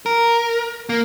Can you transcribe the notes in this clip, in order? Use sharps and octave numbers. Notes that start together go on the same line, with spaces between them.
A#4
A#3